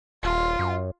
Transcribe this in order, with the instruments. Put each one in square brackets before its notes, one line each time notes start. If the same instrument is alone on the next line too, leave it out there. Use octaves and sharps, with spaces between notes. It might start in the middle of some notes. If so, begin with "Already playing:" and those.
[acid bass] D#1 [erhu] F4
[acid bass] F#2